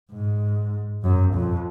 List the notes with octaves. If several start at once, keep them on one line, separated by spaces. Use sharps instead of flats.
G#2
F#2
F2